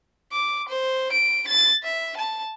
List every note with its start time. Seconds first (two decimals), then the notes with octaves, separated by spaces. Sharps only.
0.33 D6
0.69 C5
1.13 D7
1.48 A6
1.83 E5
2.17 A5